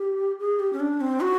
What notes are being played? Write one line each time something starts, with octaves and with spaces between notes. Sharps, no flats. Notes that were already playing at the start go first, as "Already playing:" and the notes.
Already playing: G4
G#4
G4
C#4
D4
C4
F#4